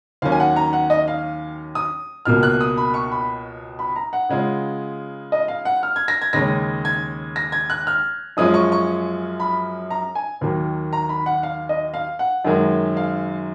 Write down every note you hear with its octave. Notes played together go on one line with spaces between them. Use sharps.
D#2 D#3 F#3 C#4 F5
G#5
F#5
A#5
F#5
D#5
F5
D#6
C#2 B2 A#3 F6
F#6
D#6
B5
C#6
B5
B5
A#5
F#5
C#3 G#3 C#4 F4
D#5
F5
F#5
F6
G#6
A#6
G#6
D#2 C#3 G#3 C#4 A#6
G#6
A#6
G#6
F#6
F6
F#2 F3 G#3 C#4 F4 D#6
C#6
C#6
B5
A#5
G#5
D#2 D#3 F#3 A#3
A#5
B5
F#5
F5
D#5
F5
F#5
F#2 D#3 G#3
F5